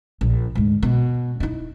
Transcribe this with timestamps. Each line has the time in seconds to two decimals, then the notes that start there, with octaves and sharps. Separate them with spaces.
0.21 A#1
0.55 D2 G#2
0.83 B2
1.40 D#4 E4